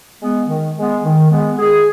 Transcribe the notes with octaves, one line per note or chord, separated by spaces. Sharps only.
G#3 B3
D#3
G#3 B3
D#3
G#3 B3
D#3 G#4